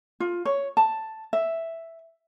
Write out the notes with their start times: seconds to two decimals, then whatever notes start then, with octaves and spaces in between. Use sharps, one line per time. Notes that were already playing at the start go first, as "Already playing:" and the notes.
0.20 F4
0.45 C#5
0.77 A5
1.33 E5